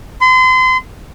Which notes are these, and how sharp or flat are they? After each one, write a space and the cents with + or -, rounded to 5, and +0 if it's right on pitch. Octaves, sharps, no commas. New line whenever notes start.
C6 -35